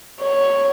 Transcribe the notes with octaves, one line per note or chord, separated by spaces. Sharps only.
C#5